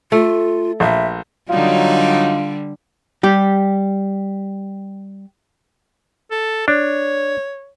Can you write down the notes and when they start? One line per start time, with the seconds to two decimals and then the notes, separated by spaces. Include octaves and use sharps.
0.12 A3 F4
0.80 A#1 E5
1.50 D3 F#3 G3 D#4 F4
3.23 G3 G4
6.31 A4
6.68 D4 C#5